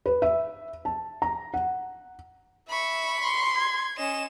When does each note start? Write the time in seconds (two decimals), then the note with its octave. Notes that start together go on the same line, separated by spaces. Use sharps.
0.06 B4
0.22 E5
0.85 A5
1.22 A#5
1.54 F#5
2.70 E5 B5 C#6
3.21 C6
3.57 G#6
3.98 C#4 D#5 E7